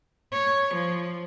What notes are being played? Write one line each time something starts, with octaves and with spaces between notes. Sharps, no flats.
C#5
F3